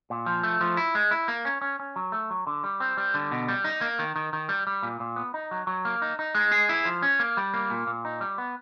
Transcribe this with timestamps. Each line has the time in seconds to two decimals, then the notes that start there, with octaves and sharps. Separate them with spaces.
0.10 A#2
0.26 F3
0.43 A3
0.61 F3
0.77 E4
0.95 G#3
1.11 E4
1.28 A#3
1.45 C#4
1.61 C#4
1.80 C#4
1.96 F#3
2.12 A3
2.30 F#3
2.47 D3
2.63 G3
2.80 C4
2.97 G3
3.14 D3
3.32 B2
3.49 G3
3.64 D#4
3.81 A#3
3.99 D#3
4.16 D#3
4.33 D#3
4.49 G3
4.67 G3
4.83 A#2
5.00 A#2
5.16 B3
5.34 D#4
5.51 F#3
5.67 F#3
5.85 A#3
6.02 D#4
6.19 D#4
6.35 G#3
6.52 G#4
6.69 E4
6.85 F3
7.02 C#4
7.20 A#3
7.37 G3
7.54 A#3
7.70 A#2
7.87 A#2
8.05 D#4
8.21 G3
8.38 B3